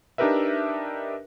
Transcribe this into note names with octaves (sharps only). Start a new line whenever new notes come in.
D4 D#4 G4 A#4 B4 E5